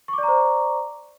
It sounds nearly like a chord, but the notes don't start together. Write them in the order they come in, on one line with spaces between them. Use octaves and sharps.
C#6 D6 D5 A#5 C5